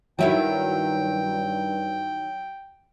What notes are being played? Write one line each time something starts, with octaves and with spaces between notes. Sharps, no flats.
G2 D#3 F#3 E4 F#4 G5